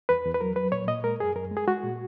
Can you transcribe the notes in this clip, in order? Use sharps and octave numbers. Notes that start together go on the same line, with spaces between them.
E2 B4
E2
B4
F#3 A#4
F#3 B4
A#2 C#5
A#2 D#5
G#3 A#4
F#2 G#4
F#2 A#4
G#3
G#4
G#3 F#4
A#2